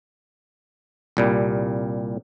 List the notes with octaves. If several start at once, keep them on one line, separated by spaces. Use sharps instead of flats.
C2 A#2 G3